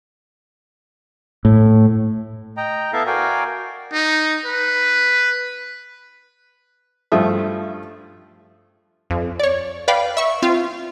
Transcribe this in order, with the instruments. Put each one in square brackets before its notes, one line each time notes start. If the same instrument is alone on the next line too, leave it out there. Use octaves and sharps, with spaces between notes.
[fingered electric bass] A2
[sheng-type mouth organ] D#5 G5 A#5
B3 E4 A4 E5 F5 A5
F#4 A#4 D5 F5 G5 G#5
[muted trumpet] D#4
B4
[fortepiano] G2 F3 A3 F4 E5 D#6
[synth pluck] F2
C#5 D5
B4 D5 F5 G5 B5
E5 C#6
C4 F4